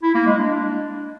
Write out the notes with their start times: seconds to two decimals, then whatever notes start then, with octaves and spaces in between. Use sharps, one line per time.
0.03 E4
0.15 A#3
0.27 G#3
0.39 D4